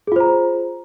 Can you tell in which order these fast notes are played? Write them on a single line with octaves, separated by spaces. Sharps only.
G#4 F4 C5 A#5